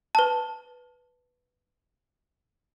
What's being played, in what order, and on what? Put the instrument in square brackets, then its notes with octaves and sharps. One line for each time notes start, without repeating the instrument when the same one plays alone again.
[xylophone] B4 A5